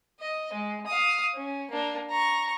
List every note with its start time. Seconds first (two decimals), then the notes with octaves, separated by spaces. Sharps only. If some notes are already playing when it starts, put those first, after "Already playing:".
0.20 D#5
0.53 G#3
0.87 F5 D#6
1.34 C#4
1.71 A#3 D4
2.10 A#5 C#6